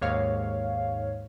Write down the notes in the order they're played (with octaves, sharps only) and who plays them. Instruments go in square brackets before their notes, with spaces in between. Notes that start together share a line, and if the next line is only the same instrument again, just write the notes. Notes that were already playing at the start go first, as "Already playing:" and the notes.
[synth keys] D#2 G#2 C#5 F5